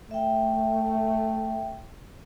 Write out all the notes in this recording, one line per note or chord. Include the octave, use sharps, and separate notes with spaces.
A3 E5 G5